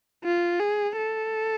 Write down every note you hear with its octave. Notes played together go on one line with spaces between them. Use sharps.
F4
G#4
A4